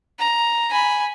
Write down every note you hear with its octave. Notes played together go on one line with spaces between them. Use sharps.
A#5
G#5 B5